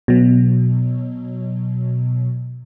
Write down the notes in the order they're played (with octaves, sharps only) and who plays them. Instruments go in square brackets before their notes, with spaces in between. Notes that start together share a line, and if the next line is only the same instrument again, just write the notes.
[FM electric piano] B2 F#3